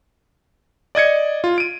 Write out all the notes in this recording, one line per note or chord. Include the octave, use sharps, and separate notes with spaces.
D5 D#5 G#6 C#7
F4
D7 D#7